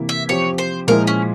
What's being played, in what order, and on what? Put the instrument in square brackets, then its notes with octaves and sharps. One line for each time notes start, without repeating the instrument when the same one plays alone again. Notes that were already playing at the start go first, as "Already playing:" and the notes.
Already playing: [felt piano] C3 E3 A#3 E4
[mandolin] E5
[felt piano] F3 C4 G4 [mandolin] C#5
[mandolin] C5
[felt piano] A#2 F3 G#3 E4 [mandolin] A#4
[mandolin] C#4